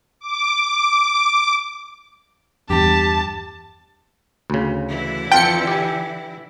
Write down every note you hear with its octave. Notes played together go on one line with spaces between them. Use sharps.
D6
E2 G2 G4 A5
D2 C#3
D3 E3 E4
F2 F4 G5 A5 C#7
G4 G#5